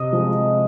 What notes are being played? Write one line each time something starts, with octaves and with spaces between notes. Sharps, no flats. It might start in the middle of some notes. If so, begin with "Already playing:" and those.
Already playing: C3 D#5 D#6
F3 G#3